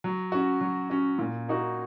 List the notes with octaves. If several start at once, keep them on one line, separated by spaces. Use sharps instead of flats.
F#3
C#4 F#4
F#3
C#4 F#4
A#2
A#3 D#4 F#4